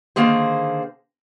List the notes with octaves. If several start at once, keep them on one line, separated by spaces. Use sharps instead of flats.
D3 D#3 A#3 G#4 C5